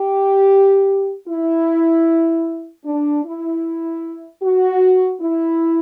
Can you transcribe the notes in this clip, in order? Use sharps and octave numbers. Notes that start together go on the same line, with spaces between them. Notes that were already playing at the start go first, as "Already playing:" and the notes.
Already playing: G4
E4
D4
E4
F#4
E4